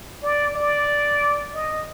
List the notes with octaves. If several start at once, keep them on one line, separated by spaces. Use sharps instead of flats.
D5
D5
D#5